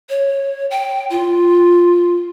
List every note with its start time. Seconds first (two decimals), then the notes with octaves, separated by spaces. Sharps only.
0.09 C#5
0.71 G5
1.10 F4